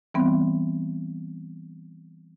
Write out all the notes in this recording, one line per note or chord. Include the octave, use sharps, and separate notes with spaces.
E3 G3 B3 C4